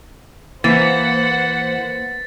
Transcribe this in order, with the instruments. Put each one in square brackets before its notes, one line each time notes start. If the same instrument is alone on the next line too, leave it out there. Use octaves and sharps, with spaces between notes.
[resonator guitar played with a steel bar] E3 [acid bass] A#3 [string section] C5 F#5 [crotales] A6 B6